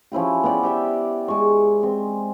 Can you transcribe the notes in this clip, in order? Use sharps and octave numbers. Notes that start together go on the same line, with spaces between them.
F3 C#4 E4 G4
B3 E4 G4 D5
G4 E5 G5
G#3 C#6
C4